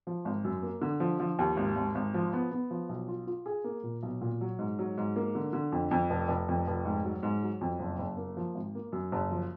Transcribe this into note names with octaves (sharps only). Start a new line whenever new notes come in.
F3
G#1
F#2
A#3
D3
F3
F3
D#2
G#1
G#1
G#1
F3
B3
B3
F3
B1
F4
F4
G#4
A#3
A#2
B1
A#2
F#3
G#2
F#3
G#2
A#3
D3
D3
F2
F2
F1
F1
F2
F1
G#2
F#3
G#2
F#3
F2
F#1
F#1
A#3
F3
G#1
A#3
F#2
F#1
F3